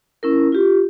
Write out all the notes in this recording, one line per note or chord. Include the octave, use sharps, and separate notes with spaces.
C#4 E4 A#4
F4 G4